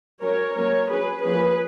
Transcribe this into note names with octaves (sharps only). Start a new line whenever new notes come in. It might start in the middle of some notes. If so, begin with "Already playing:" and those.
F#3 C#4 A#4 C#5
F#3 A#3 C#4 A#4 C#5
F#3 C#4 G#4 B4
F3 A#3 C#4 G#4 B4